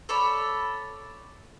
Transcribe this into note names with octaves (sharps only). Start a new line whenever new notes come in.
A4 C#5 D5 B5